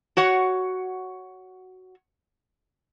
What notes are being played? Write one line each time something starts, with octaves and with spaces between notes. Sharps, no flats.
F#4 C#5 F#5